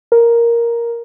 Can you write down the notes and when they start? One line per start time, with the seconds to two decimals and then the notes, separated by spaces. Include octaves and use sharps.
0.12 A#4